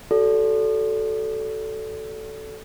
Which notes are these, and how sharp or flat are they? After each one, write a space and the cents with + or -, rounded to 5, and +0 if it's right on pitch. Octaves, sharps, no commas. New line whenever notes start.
F#4 +35 A4 -5 D5 -30